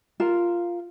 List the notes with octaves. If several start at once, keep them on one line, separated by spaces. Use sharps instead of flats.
F4 A#4